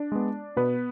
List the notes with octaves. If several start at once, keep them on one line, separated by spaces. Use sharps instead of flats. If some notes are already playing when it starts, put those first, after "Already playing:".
Already playing: D4 D5
G#3 B3
B2 B3 B4